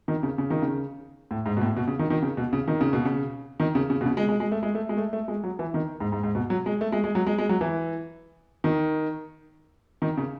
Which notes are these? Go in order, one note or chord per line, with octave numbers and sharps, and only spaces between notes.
D#3
C#3
C#3
D#3
C#3
A2
G#2
B2
A2
B2
C#3
D#3
D#3
C#3
B2
C#3
D#3
C#3
B2
C#3
D#3
C#3
C#3
B2
C#3
G#3
G#3
G#3
A3
G#3
A3
G#3
A3
A3
G#3
F#3
E3
D#3
G#2
G#2
G#2
B2
F#3
G#3
A3
G#3
G#3
F#3
G#3
G#3
F#3
E3
D#3
D#3
C#3